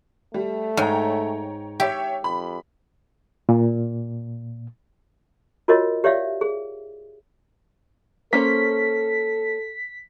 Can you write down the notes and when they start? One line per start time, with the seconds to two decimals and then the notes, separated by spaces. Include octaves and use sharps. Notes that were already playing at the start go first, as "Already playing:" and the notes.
0.34 G3 A3
0.77 G#2 C#5 G5 A#5
1.80 G4 C#5 E5 G5
2.24 F2 B5
3.49 A#2
5.68 F4 F#4 A#4 C#5 D#5
6.04 G4 C#5 D5 E5 F5
6.41 G#4
8.33 A#3 C#4 A4 C5 B6